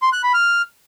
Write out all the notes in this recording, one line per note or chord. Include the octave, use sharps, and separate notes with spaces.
C6
F#6
B5
F6